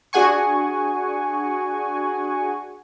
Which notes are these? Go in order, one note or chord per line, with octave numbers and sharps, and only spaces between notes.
D4 F#4 G#4 F#5 G#5 C#6